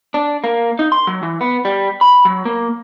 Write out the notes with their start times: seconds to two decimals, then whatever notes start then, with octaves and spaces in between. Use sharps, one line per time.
0.14 D4
0.44 A#3
0.79 D#4
0.92 C6
1.07 F#3
1.23 E3
1.41 B3
1.65 G3
2.01 B5
2.25 F#3
2.45 A#3